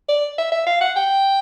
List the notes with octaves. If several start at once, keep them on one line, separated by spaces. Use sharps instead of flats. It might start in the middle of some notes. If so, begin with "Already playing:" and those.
D5
E5
E5
F5
F#5
G5